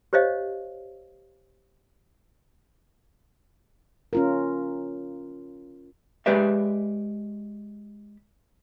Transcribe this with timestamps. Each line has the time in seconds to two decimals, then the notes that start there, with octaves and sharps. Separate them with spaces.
0.13 G4 C5 C#5 D#5 F5
4.13 C#4 F4 A#4
6.26 G#3 G4 B4 D5 E5